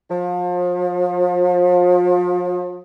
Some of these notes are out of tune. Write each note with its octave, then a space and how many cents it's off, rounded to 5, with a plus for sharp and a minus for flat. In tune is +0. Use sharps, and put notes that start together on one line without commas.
F3 +35